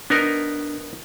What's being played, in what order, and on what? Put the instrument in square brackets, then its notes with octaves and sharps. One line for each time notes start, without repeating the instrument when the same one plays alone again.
[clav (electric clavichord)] B3 D#4 A#4 [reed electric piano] D4